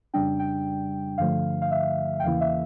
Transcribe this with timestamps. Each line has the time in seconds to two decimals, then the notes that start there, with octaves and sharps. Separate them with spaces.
0.14 F2 C#3 G3 D4 G5
0.39 G5
1.18 G2 D3 F3 A3 F5
1.62 F5
1.71 E5
2.20 G5
2.23 E2 C#3 E3 A#3 E4 F5
2.41 E5